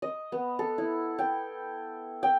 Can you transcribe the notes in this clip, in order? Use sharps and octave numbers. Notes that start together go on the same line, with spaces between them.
D#5
B3
A4
E4
G5
G5